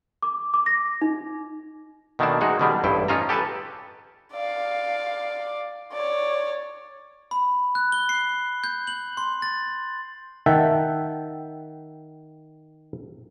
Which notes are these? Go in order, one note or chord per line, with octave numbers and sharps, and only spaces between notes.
D6
D6
A#6
D#4
B2 D#3 A3 A#3 D4 A5
G#3 D#4 F#4
B2 D3 D#3 G3 D4
A1 G2 E4 G5
C#4 D#4 F4 A5 A#5
G4 A4 B4 G#5 A5
D5 F5
C#5 D5
B5
F#6
G7
C7
G6
F#7
C6
A6
D#3 E5 F#5 G5 A5